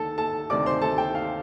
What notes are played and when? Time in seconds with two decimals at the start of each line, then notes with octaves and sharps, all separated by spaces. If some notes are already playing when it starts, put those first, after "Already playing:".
Already playing: D2 D#3 A4 A5
0.18 A4 A5
0.50 D2 C3 D#3 D5 D6
0.66 C5 C6
0.82 A4 A5
0.98 G5
1.15 F5